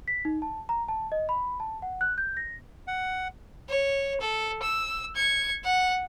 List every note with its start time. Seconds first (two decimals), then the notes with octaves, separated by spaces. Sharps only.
0.08 B6
0.25 D#4
0.42 A5
0.69 A#5
0.89 A5
1.12 D#5
1.29 B5
1.60 A5
1.82 F#5
2.01 F#6
2.18 G6
2.37 A#6
2.88 F#5
3.69 C#5
4.21 A4
4.62 E6
5.16 G#6 C#7
5.64 F#5